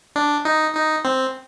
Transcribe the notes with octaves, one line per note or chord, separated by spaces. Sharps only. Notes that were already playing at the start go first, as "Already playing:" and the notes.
D4
D#4
D#4
C4